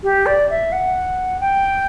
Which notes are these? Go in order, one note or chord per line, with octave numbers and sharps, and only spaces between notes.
G4
D5
E5
F#5
G5